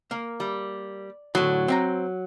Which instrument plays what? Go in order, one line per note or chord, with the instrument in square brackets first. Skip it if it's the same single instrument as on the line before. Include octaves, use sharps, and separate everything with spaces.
[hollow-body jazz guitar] A#3 A#4
[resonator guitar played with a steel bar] G3
[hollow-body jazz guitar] A2 D3 [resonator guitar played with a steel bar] F#3
[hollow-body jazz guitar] C4 E5 A#5